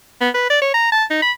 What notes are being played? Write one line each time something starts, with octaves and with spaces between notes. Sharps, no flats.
B3
B4
D5
C#5
A#5
A5
D#4
B5